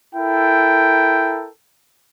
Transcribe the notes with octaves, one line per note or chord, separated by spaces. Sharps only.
E4 A4 A#4 G5